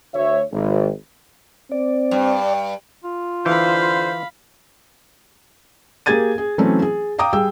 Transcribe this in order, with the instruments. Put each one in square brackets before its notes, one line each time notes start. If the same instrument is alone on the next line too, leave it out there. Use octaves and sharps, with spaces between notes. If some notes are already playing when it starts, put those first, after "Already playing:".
[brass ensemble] D2 C#5 E5
G#1
[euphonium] C4 [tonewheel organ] D5
[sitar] G2
[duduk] F4
[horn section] D3 C5 [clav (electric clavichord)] E3 [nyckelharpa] F5 B5
[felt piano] A#3 G4 G#4 G#6 A6 D#7
G#4
E3 F#3 A3 C4 C#4
G#4
F5 G5 A#5 D6 D#6
G3 G#4 G5 E6